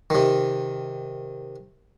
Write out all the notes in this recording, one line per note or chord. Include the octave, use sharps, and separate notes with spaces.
C3 D#3